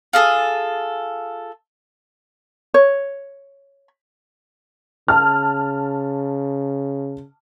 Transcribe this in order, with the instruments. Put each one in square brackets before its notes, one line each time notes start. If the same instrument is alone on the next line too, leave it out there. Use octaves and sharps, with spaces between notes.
[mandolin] F4 G#4 A4
[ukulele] C#5
[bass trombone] C#3 [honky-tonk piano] A5 F6